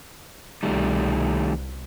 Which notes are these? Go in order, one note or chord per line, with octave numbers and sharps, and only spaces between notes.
C2 B2 D#3 G3 A3